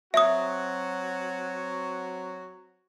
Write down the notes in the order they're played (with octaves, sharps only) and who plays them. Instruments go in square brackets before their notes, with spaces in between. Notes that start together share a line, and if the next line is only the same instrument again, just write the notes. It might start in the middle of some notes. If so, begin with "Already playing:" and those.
[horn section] F#3 C4 F#4 [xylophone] E5 D#6